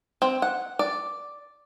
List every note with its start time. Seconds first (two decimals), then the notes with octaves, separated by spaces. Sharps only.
0.22 C4
0.42 F#5
0.79 D5